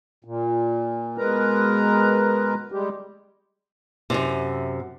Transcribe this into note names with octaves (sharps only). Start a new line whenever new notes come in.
A#2
B2 G#3 A#4 B4 A#5
G3 G#3 G4
F#2 A2 C3